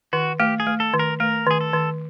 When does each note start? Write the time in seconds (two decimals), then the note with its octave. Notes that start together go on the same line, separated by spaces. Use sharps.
0.13 D#3 F#4
0.40 A3 G4
0.60 G#4
0.67 A3
0.80 A4
0.94 D#3
0.99 A#4
1.20 A3 A#4
1.46 D#3 G#4
1.61 A4
1.74 D#3